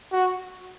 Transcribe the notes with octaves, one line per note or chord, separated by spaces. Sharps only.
F#4